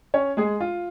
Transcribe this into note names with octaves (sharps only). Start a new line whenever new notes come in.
C#4 C#5
G#3 G#4
F4